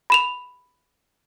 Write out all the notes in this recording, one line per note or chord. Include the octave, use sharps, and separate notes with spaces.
B5 E7 F7